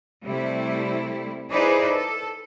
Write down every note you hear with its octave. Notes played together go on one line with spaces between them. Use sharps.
C3 G3 A3 E4
D#4 E4 G#4 B4 C5 D5
A4